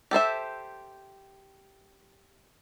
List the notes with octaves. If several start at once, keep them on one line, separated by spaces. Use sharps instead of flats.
G4 A4 C5 E5